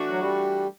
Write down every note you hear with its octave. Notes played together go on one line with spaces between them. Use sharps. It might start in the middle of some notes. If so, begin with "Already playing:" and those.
Already playing: E3 A3 D4 F#4
F#3
G3